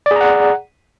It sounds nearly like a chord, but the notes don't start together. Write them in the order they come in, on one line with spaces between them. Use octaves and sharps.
D5 G#4 A#5 F#5